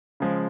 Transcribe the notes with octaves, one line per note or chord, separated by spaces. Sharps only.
C#3 F3 G#3